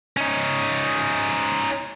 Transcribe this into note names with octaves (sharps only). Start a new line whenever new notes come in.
C#4 D#4